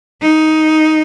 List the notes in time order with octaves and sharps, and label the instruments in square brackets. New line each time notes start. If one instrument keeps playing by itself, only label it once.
[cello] D#4